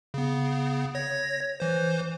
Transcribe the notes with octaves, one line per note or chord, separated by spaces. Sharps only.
C#3 B3
C#5 G#6 A#6
E3 C5